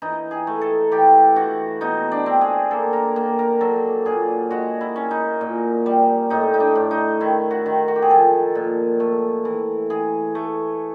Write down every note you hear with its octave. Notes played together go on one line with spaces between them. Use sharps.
E3 D#4
G#4
A3
A4
E3 G4
E3 F#4
B2 D#4
D4
C4
G#4
A#3 A4
A#4
A#3
A#4
F#3 A4
A#2 G#4
G#3 F#4
E4
C#4
D#4
A#2
G3
A2 D#4
D#4
D4
A2
D#4
D#3 E4
F#4
D#3
F#4
G4
G#4
F3 A4
A#2
A3
E3
E3 G#4
A3